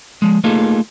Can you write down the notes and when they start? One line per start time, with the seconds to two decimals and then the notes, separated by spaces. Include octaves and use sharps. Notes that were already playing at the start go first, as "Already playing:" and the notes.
0.22 F3 G#3
0.44 A3 A#3 D#4 F4 G#4 A4